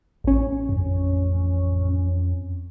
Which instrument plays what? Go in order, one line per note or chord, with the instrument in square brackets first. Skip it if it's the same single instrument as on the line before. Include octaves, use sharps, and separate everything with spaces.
[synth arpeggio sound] A1 C#4
[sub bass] F2